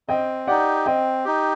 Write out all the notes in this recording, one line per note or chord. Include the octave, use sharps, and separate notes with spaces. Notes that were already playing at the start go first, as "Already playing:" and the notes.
C4 D#5 G5
D#4 G4 D5 F#5
C4 D#5 G5
D#4 G4